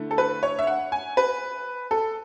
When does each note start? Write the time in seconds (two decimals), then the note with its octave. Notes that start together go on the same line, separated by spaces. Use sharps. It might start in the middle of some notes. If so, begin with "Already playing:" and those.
Already playing: D3 A3 E4
0.11 A4
0.18 B4
0.43 C#5
0.59 E5
0.67 F#5
0.92 G#5
1.17 B4
1.91 A4